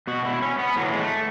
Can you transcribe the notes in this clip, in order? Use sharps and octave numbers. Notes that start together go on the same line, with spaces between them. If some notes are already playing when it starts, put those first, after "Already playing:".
B2 F#4
E4
C#4
B3
A2 E3 F#3
G#3
A3